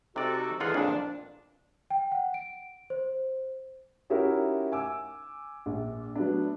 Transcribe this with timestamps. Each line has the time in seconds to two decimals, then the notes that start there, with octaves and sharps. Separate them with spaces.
0.16 C3 D#4 F#4 A4 D5
0.60 A2 D3 E3 F4 G#4 F#5
0.74 A#1 F2 A#2 D4
1.90 G5
2.12 F#5
2.34 D7
2.90 C5
4.10 C#4 D#4 E4 F#4 G4 A#4
4.72 G#5 D6 E6
5.66 A#1
6.15 F#3 A3 B3 D4